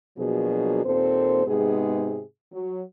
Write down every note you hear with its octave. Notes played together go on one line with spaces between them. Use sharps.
B2 F3 F#3 A#3 D4 G#4
D#2 A#2 C4 A4 C5
G#2 C3 G#3 B3 D#4 G#4
F#3